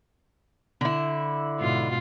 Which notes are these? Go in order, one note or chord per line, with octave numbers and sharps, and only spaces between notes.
D3 E4
G#2 B2 F4